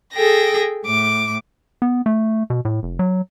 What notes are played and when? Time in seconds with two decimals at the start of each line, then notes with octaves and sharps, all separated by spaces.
0.12 G#4 A4 G5 A#6
0.83 A2 D6
1.82 B3
2.06 A3
2.50 B2
2.65 A2
2.83 F1
2.99 F#3